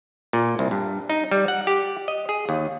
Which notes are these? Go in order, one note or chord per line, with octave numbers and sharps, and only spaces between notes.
A#2
C2
G2
D#4
G3
F#5
G4
D#5
G#4
D#2